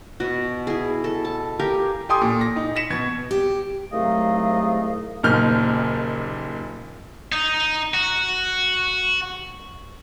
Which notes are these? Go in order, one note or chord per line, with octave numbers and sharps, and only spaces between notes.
B2 F#4
E4 G#4
A4
A5
G4 A#4 F5 G#5
G4 A4 G5 G#5 C6 D#6
A#2
A#6
D#4
A#6 B6 C#7 E7
B2 G#6
G4
C2 G#2 F#3 A3 D#5 F5
F#1 D#2 A#2 F6 G6
D#4
F#4